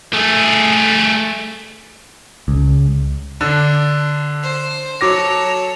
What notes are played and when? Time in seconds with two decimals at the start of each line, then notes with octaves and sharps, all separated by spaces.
0.13 A3 G#4
2.48 C#2
3.41 D3 D4
4.43 C5
5.01 F#3 A4 C#5 D6 A#6